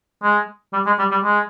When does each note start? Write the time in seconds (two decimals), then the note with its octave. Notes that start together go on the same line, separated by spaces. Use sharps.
0.23 G#3
0.73 G3
0.86 G#3
0.99 G3
1.11 G3
1.24 G#3